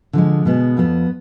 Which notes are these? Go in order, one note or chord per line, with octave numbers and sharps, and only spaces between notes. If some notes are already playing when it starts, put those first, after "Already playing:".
D3 F3 G#3
B2 G#3 B3
F2 F3 B3